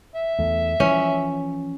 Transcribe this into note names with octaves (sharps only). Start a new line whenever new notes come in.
E5
E2 A3
E3 F3 C#4